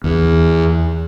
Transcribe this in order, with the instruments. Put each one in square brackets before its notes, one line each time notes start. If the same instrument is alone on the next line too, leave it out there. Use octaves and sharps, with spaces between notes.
[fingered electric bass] E2